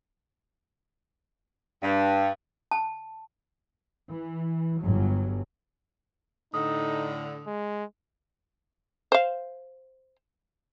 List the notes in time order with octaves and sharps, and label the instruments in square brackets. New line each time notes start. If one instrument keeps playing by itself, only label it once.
[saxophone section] G2
[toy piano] A5
[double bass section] E3
G1 F#3
[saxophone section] A2 D3 [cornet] D#4 [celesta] D#6
[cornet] G#3
[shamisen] C5 F5